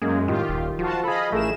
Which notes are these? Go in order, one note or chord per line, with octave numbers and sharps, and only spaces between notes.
F#2 G#3 A#3 G#4
A2 D#3 F4 G4
D#1
F3 F4 F#4 A5
G#4 A4 D#5 F5 B5
A1 A3 E4 G#4 A#4 E7